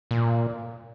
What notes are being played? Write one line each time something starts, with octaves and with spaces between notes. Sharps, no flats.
A#2